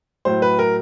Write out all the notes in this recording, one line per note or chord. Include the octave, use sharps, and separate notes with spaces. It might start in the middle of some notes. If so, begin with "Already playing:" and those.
A2 F#3 A3 C5
B4
A#4